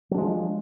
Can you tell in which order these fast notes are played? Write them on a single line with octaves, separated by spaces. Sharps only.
F#3 D4 G#3 F3